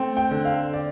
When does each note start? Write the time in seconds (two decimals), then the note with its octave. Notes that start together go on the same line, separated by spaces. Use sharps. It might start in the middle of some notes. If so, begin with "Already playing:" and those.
Already playing: A3 C4
0.17 G5
0.31 D3
0.45 F5
0.73 D5